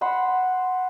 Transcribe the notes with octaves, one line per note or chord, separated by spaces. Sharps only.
C5 F#5 B5 C6